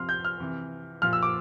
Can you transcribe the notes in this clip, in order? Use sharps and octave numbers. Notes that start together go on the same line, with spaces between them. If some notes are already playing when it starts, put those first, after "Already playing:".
Already playing: C3 F3 C6 F6
G6
F6
C3 E3
A#2 F3 F6
E6
D6